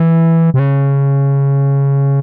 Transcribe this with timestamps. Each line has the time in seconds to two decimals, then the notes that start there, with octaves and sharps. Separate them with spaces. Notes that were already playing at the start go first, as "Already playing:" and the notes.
Already playing: E3
0.54 C3
0.59 C#3